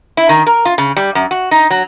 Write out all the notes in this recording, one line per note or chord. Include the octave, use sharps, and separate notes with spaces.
E4
D#3
A#4
F4
C#3
G3
F#2
F#4
D#4
F#3